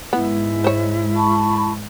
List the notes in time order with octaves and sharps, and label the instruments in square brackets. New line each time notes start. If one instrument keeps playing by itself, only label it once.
[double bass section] G#2 G#3 [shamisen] B3 [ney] E4
[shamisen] C5 C#5
[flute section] A5 B5 C#6